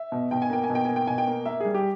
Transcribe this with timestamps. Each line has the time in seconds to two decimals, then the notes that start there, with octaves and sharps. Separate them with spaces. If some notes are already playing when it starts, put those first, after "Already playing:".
Already playing: E5
0.12 B2
0.31 B2 G5
0.42 G#5
0.50 A#3 G5
0.64 G#5
0.70 B2
0.75 G5
0.85 A#3 G#5
0.96 G5
1.07 B2 G#5
1.18 G5
1.27 A#3
1.46 A#3 E5
1.60 G3 G#4
1.74 G4